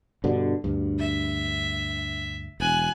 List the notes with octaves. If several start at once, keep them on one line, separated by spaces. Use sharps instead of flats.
G2 B2 D3
D2 G2
E5
E1 G#5 F#6